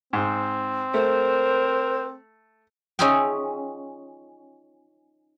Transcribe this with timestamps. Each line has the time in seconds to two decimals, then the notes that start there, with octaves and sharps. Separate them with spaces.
0.13 G#2 C4
0.94 A3 A#4 C5
2.99 C#4 D#4 F4 G#4 E5 G5